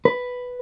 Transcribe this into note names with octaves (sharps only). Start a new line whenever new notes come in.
B4